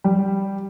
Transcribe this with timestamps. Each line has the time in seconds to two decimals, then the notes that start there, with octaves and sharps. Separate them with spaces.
0.04 G3